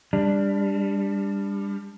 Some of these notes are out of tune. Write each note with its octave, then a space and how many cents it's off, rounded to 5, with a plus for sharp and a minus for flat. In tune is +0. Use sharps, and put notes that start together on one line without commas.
G3 +30 D4 +0